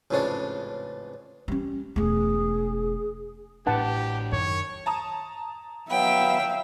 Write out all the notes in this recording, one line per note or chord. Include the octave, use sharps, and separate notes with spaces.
A1 F2 G#2 C#3 C#4 D4
G3 C#4
E1 A3 G#4
A1 A2 D4 G4 B4 F#5 A5
F#2 D#3 C#5
A5 A#5 D#6
F#3 B3 E5 F5 G5 B5